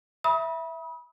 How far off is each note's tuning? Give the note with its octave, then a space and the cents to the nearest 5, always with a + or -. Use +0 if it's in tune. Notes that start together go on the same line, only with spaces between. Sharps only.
E5 +0 B5 -30 D#6 +35